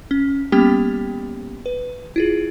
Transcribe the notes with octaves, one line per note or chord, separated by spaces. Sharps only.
C#4
G3 A#3 B3 C#4 G4 G5
B4
E4 F4 G#4